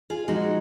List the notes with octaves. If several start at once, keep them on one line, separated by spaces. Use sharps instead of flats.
F4 G#4
A#2 F3 G#3 D#4 F#4